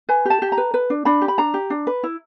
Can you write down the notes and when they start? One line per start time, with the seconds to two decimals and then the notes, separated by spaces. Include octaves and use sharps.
0.09 B4 G#5
0.25 G4 A5
0.42 G4
0.52 A#5
0.58 B4
0.74 B4
0.90 D4
1.05 D4 B5
1.21 G4
1.28 B5
1.38 D4 A#5
1.54 G4
1.70 D4
1.87 B4
2.03 E4